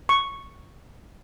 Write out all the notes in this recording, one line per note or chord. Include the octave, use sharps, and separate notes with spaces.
C#6